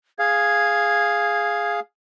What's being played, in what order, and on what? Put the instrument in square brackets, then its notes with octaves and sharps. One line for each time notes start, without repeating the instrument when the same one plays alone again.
[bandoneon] G#4 F5 [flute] G#6